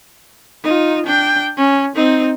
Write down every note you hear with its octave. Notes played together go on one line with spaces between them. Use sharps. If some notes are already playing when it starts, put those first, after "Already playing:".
D#4 F4
D4 G5
C#4
C4 D#4